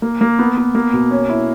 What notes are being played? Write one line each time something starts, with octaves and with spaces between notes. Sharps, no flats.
A#3
A#3
B3
B3
A#3
B2
C#4
E4